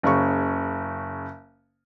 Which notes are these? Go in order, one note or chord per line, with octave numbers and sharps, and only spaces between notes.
F#1 C#3 C#6